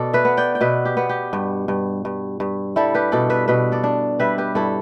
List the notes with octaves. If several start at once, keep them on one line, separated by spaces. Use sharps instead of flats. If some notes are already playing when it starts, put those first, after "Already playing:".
Already playing: B2 A4 D5
B4 E5
B3
D5 G5
G5
B2 B4 E5
G4
B3
G4
G2
G2
G2
G2
G3 E4 A4
G4 B4
B2 A4 D5
B4 E5
B2 B4 E5
A4 D5
D4
G3 B4 E5
G4 B4
G2 E4 A4